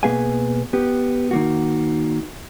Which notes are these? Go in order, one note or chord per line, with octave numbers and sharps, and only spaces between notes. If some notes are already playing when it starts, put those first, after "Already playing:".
B2 A#3 G#4 B4 F5 G#5
B3 G4
D#3 A#3 F#4